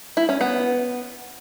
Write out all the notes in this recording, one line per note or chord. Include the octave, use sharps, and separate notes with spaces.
E4
C#4
B3